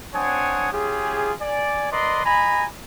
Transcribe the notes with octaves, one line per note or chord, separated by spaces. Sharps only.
C4 D4 C#5 F#5 G#5 D#6
C#4 F4 G4 G#4
D5 G#5
A#4 B4 D5 D#5 C6
D#5 G#5 A#5 B5